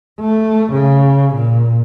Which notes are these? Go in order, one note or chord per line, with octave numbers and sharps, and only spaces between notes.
A3
C#3
A#2